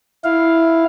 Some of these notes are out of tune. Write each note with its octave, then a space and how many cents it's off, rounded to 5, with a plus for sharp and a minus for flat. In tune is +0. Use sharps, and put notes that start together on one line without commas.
E4 +0 F5 +0